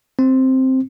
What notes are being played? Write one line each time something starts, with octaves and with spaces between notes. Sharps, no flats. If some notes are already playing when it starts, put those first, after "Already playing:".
C4